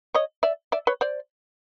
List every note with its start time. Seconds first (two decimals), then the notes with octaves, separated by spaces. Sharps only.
0.14 C#5 D#5
0.43 D5 E5
0.72 D5 E5
0.87 B4 C#5
1.01 C5 D5